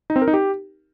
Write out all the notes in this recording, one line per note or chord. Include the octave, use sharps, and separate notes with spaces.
D#4
C4
A#4
D#4
G4